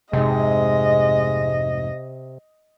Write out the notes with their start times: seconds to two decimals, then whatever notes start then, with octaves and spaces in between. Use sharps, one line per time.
0.13 F1 G#2 C3 G#3 D#5